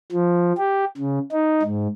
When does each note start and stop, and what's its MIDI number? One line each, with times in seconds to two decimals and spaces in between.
0.12 0.53 53
0.57 0.84 67
0.97 1.19 49
1.32 1.62 63
1.63 1.88 44